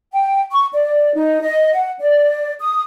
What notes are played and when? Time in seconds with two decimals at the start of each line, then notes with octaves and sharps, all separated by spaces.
0.13 G5
0.51 C#6
0.74 D5
1.14 D#4
1.42 D#5
1.74 F#5
2.00 D5
2.61 D#6